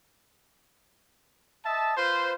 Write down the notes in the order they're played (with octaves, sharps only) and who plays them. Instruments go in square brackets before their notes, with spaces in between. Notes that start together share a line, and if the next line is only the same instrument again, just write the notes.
[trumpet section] D#5 E5 A5
F4 B4 C5